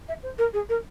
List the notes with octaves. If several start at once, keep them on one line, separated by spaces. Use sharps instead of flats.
E5
C5
A#4
G#4
A#4